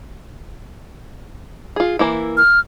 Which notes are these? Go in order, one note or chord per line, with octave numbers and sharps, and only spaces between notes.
F4 G#4
E3 A#3 E4
F6